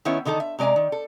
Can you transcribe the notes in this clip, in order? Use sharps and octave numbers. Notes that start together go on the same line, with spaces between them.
D#3 B3 C#4 E4 C#5
D3 D#3 D#4 A4 A5
E5
C3 G#3 D5 G#5 A#5
D#3
A4